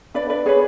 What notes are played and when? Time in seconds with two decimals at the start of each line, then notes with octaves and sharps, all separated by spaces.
0.14 D4 B4 D5
0.30 B4 D5
0.46 G#4 B4 C#5